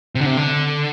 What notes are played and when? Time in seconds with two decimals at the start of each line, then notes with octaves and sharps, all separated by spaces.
0.15 C3
0.21 D3
0.26 C3
0.37 D3